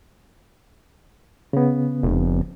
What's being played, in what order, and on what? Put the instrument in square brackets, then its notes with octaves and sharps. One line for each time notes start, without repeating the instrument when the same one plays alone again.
[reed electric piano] C#3 B3
[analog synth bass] F1